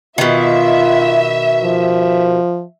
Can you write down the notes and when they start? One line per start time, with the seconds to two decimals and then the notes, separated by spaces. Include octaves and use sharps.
0.18 B2 D#3 F4 E5
1.64 F3